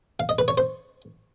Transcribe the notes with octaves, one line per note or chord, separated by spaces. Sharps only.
F5
D#5
B4
C#5
C5